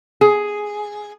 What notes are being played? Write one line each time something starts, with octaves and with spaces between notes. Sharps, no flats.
G#4